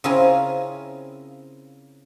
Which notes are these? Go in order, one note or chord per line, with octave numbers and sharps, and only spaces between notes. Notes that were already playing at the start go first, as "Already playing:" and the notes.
C#3 C4 E4 F4 A#4 G#5